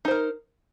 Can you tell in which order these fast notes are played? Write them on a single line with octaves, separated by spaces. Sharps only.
D#4 C5 A#4